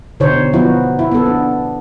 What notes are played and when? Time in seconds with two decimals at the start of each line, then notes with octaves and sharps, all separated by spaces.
0.20 B2 D3 D#4 C5 C#5
0.53 F3 B3 D#4 E4 F#4
0.99 E4
1.12 B3 A4
1.26 D4